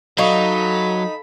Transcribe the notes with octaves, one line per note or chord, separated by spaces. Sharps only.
F#3 D#4 A4 F5 B5 C#6